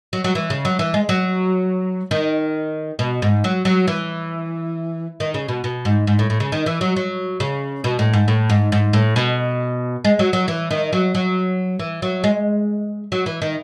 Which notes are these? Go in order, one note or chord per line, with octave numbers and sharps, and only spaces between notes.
F#3
F#3
E3
C#3
F#3
E3
G#3
F#3
D#3
B2
G#2
F#3
F#3
E3
D#3
C#3
B2
B2
G#2
G#2
A2
A2
C#3
D#3
E3
F#3
F#3
C#3
B2
A2
G#2
A2
G#2
G#2
A2
B2
G#3
F#3
F#3
E3
D#3
F#3
F#3
E3
F#3
G#3
F#3
E3
D#3